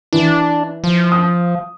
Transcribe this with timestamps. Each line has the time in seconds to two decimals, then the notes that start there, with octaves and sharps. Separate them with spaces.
0.13 E3 D4
0.84 F3
1.12 D#6